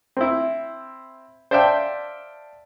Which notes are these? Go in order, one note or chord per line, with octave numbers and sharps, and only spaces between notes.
C4 E4
C5 D5 E5 F5 G5 A5